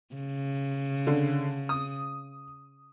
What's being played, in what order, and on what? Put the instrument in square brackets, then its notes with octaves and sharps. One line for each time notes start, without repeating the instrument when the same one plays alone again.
[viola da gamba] C#3
[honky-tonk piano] D3
D#6